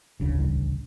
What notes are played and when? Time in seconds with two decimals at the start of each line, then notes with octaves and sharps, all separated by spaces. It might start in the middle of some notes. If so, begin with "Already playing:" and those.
0.20 E1 A1 D2 C#3
0.39 C2